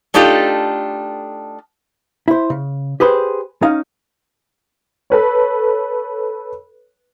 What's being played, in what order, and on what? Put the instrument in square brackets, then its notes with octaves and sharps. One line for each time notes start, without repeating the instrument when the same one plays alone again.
[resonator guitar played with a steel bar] A3 D4 D#4 F4 G4 A4
[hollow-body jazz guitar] E4 C5
C#3
G4 G#4 B4 C5
C#4 D#4 F5
[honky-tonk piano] A4 B4 C#5